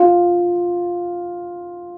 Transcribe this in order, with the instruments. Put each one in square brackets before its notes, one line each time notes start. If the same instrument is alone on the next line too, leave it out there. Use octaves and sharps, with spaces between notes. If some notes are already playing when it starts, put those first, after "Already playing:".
Already playing: [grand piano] F4